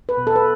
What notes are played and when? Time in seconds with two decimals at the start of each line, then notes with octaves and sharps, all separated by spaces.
0.09 B4
0.17 B2
0.27 A4
0.36 B4